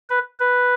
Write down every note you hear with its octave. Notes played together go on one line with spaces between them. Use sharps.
B4
B4